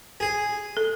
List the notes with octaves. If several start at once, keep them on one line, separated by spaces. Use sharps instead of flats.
G#4
A4